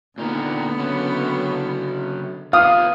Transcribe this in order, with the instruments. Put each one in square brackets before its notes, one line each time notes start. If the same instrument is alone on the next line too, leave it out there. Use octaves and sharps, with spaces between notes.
[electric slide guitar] A#2 D#4 A#4 [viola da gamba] D3 B3
[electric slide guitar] C#3 F#3 C#4
[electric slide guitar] B3 F4 [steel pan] F5 [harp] D#6